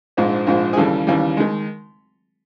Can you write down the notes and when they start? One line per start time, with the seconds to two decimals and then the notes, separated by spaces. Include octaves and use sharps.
0.17 A#1 G#2 F3 G#3
0.47 A#1 G#2 F3 G#3
0.73 G#4
0.77 D#2 C#3 E3 G3 A4
1.07 D#2 C#3 E3 G3
1.37 D#3 G#3